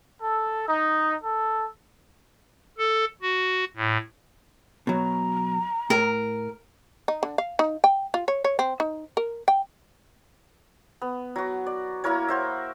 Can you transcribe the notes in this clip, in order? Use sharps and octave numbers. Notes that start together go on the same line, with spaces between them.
A4
D#4
A4
A4
F#4
A2
B2 F#3 A#5
A2 A#4
D#4
D3
F5
D#4
G5
F4
C#5
C#5
C4
D#4
A#4
G5
B3
F#3 F#4
D5
A#3 E4 A#4 C#5
F#4 C5 E5